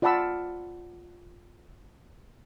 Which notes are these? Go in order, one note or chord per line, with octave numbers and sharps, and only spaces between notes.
F4 D5 F#5 A5 B5 E6